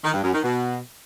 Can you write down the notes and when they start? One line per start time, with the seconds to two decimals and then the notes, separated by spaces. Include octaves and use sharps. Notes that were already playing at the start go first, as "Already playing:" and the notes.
0.04 D#3
0.14 G2
0.24 F#2
0.34 D#3
0.44 B2